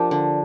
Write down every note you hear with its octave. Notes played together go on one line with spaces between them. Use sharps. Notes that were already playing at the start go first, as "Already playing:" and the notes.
Already playing: F3 A#3 D4 G4 A#4
D3